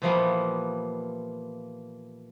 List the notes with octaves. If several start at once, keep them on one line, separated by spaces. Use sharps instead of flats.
A#2 E3 F3 G3 A#3 B3